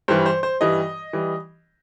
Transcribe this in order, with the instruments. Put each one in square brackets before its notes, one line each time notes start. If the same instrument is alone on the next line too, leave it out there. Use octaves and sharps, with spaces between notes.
[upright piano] G2 E3 G3 C5
C5
C5
G2 E3 G3 D#5
E3 G3